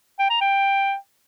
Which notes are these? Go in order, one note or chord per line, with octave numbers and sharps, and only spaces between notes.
G5
A#5
G5